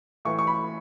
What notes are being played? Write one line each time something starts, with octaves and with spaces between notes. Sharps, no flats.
A2 E3 C#6
C#6
B5